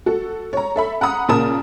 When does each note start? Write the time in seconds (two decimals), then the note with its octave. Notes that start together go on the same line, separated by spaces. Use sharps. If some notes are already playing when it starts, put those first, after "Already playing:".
0.06 F#4 A4
0.53 C#5 A#5
0.76 A4 E5 B5
1.01 F#5 A#5 B5 D#6
1.29 A#2 C#3 A#4 A5 D#6 E7